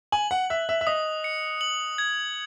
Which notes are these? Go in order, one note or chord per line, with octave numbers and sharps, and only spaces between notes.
G#5 F#7
F#5
E5 F#6
E5
E5
D#5 D#6
C#7
F#7
G#6